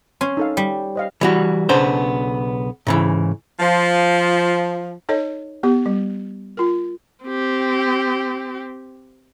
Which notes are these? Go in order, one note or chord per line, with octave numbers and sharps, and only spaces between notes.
C#4 C6
D#4 A4 F5
G3
C5 D#5 F5
E3 G3 F#4
B1 C#3 B3 D4 C5
G#2 C#3 E3
F3
D#4 A4 C#5 D#5
B3 G4
G3
F4 A#4
C4 G4